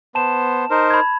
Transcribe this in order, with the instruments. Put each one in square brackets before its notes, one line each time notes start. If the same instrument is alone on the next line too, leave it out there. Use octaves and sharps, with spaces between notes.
[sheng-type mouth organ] B3 C5 [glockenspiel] A5 E7
[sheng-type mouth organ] D#4 A#4 C5
[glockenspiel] B5 G#6